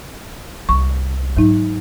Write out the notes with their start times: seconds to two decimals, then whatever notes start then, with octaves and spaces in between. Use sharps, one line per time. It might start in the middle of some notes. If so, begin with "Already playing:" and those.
0.69 C2 C#6
1.37 G#2 F#3 D#4